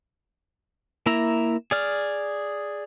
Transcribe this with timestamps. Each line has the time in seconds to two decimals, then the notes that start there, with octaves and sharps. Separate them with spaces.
1.06 A#3 E4 E5 A#5
1.71 G#4 D5 F6